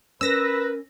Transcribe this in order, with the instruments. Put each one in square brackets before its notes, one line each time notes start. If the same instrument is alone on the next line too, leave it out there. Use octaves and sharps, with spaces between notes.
[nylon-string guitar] C#4 [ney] A#4 [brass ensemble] B4 [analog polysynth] E6 A#6